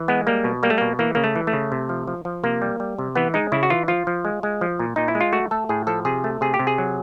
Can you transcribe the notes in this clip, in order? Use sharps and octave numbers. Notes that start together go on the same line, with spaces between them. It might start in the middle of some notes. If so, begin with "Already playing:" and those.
Already playing: E3
G#3 B3
G3 A#3
B2
G3 A#3
A3
B2 A#3
E3 A#3
C#3 A#3
A3
E3
A3
C#3
C3
F3
F3
F3
C3 A#3
G3
G3
C3
E3 B3
G#3 D#4
C#3 E4
F#4
E3 F4
F3 F4
F3
G#3
G#3
F3
A#2
A#2 D#4
E4
G#3
F4
A3 F#4
A3 A4
A2 G#4
F3 A4
C3 G#4
A3
C3 G#4
G4
C3
G#4
F#3